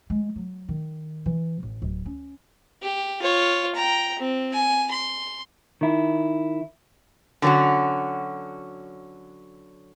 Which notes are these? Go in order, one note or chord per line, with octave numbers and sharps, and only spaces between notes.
G#3
F#3
D#3
E3
A1
D1
C#4
G4
F4 C#5
G5 A#5
C4
G#5
C6
D#3 E4
D3 F#3 C4 C#4 F#4